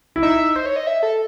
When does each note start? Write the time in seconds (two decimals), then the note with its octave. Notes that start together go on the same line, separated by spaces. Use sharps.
0.16 E4
0.23 D#4 E5
0.56 C5
0.66 C#5
0.76 D#5
0.87 E5
1.03 A4